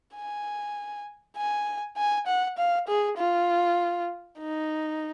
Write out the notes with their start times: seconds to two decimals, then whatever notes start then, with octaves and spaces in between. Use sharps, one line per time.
0.16 G#5
1.37 G#5
1.98 G#5
2.27 F#5
2.58 F5
2.88 G#4
3.18 F4
4.39 D#4